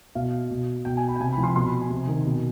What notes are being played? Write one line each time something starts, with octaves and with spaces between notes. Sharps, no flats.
B2 F5
B2
B2 G5
G#5
B5
G5
C3 G#5
B5
F3
C6
B2 C6
B5
G#5
C3
D#3
B2